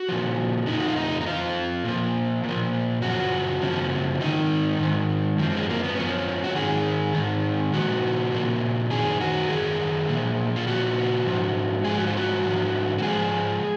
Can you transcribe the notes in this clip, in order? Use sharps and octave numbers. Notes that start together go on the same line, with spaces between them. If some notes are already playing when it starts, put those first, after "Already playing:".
Already playing: F#4
A#2 F3
F2 F3 D#4
F#4
F4
D#4
D#4
F2 F3 F4
A#2 F3
A#2
F3
F#2 C#3 F3 F#4
F#2 C#3 F3
G#2 D#3 D#4
G#2 D#3
F#2 F3
G#3
A#3
B3
F#2 F3 C#4
F#4
G#2 D#3 G#4
G#2 D#3
A#2 F3 F#4
A#2 F3
F#2 D#3 G#4
F#4
F#2 D#3 G#4
A#2 F3
F4
A#2 F3 F#4
G#2 F3
G#2 F3 G#4
F#4
F4
F#4
G#2 F3
F#4
G#2 F3 G#4